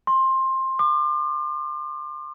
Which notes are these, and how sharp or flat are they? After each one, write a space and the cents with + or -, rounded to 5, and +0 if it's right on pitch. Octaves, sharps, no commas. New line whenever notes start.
C6 +15
D6 +35